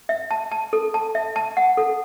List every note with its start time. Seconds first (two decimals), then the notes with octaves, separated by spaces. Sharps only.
0.09 E5
0.31 A5
0.51 A5
0.73 A4
0.94 A5
1.15 E5
1.36 A5
1.57 F#5
1.77 A4